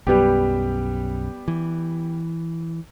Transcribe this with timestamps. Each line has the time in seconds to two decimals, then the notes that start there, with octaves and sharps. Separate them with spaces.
0.07 B1 F#2 G3 B3 G4
1.48 E3